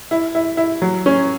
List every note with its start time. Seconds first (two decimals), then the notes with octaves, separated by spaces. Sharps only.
0.11 E4
0.35 E4
0.57 E4
0.82 F#3
1.06 C#4